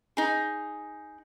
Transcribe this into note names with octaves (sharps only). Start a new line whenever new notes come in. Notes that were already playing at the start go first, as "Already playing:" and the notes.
D#4 G#4